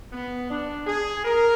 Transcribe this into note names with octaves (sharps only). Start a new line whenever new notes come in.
B3
D4
G#4
A#4